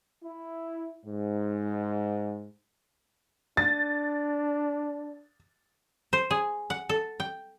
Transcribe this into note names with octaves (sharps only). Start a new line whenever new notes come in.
E4
G#2
D4 A6
C5
G#4
F#5
A4
G5